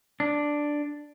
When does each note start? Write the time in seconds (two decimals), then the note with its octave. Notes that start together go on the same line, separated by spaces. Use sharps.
0.20 D4